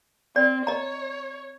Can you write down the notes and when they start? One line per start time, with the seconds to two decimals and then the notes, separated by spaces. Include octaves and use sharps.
0.36 C4 D5
0.67 C#5 D#5 A#5